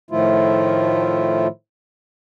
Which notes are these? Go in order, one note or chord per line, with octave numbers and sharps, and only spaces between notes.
A2 D#3 F3 A3 E4 F4